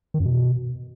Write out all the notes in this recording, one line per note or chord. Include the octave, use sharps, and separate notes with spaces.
D#3
F#2
B2